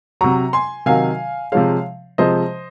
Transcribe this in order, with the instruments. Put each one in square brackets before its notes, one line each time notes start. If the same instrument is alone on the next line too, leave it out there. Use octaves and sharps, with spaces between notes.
[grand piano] C3 F#3 A#5 C#6
G#5 C6
C3 D#3 F#3 F5 G#5
C3 F3 G#3 C#5 F5
C3 F3 G#3 C5 D#5